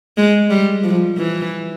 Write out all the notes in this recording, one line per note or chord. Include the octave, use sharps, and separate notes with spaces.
G#3
G3
F3
E3